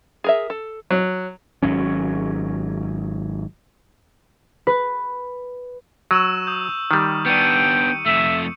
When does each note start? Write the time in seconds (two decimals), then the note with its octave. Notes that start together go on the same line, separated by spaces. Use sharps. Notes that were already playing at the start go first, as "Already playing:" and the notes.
0.24 G#4 A#4 E5
0.50 A4
0.90 F#3
1.63 G#1 G#2 F#3 C#4
4.67 B4
6.11 F#3 C#6 E6 E7
6.47 D#6 G6
6.91 D#3 G3
7.26 B3 D4 G5 C#7 D#7
8.06 F2 A3 E5